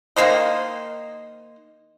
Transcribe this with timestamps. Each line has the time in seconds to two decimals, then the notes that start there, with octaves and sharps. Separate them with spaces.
0.16 D#3 A#3 C5 D#5